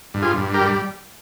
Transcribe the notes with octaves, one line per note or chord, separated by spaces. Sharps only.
G2
F4 G#4
G2
G4 A#4
G3